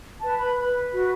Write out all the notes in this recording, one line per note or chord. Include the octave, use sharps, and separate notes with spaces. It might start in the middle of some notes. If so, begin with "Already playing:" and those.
B4 A5
B5
B4 B5
F#4